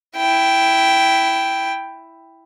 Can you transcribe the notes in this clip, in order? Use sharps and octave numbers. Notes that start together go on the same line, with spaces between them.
E4 G5